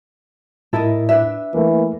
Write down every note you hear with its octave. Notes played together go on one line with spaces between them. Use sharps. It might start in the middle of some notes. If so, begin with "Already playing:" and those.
A2 E4 A4 A#4 D#5
D4 B4 E5
E3 A3 A#3